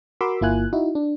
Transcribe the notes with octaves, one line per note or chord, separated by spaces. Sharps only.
F#4 A#4 B5 C6 D6 E6
G1 A#3 E4 F4 G#5 F#6
D#4 E4 F#4
D4